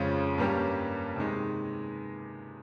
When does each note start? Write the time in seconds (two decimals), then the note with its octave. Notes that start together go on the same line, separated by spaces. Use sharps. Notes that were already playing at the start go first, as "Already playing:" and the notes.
Already playing: F2 C#3 F3 G#3 C#4
0.38 G2 G3 A#3 C#4 G4
1.16 C3 D#3 G#3 D#4